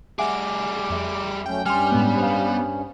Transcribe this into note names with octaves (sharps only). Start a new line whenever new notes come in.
G3 G#4 E5 F#5 G#5 D6
F2 E5
F#3 A3 C#4 G5
G2 G3 C#4 G#5 C6 F6
A2 G#3 B3
C5 F5